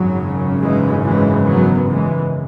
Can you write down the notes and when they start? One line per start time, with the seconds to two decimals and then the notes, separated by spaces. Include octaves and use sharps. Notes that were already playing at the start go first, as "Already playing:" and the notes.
Already playing: G#1 F#2 C#3 F#3
0.61 E3 G#3
1.04 E3 G#3
1.47 F#3 B3
1.90 E3 G#3